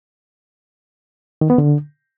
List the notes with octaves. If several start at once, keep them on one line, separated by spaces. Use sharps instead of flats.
D#3
B3
D3